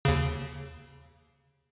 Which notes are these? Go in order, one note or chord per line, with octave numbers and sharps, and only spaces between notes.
D#2 C#3